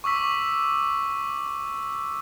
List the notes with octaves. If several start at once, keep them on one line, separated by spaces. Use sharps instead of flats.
C#6 D6 E6 B6